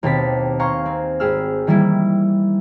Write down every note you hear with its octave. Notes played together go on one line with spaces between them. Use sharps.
D#2 B2 C4 G4 A5 B6
F5 G#5 A#5 C6 C#6 G6
C4
G#1 G4 G#4 E6 F6
D#3 E3 G3 A#3 E4